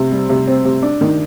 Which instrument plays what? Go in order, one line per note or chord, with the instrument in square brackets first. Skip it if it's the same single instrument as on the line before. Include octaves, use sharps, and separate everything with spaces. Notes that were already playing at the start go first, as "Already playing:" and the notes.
Already playing: [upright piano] C3 C4
G3
C3
C4
C3
D4
D#3